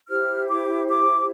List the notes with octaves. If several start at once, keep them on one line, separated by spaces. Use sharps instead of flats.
E4 G4 C5 F6
D6
D6